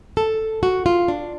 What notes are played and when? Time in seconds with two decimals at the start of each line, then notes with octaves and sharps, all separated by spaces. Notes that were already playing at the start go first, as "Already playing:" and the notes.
0.17 A4
0.63 F#4
0.86 F4
1.08 D4